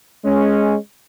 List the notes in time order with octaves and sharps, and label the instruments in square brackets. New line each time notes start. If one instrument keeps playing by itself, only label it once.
[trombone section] G#3 C#4